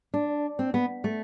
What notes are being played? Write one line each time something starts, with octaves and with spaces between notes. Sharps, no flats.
D4
C4
B3
A3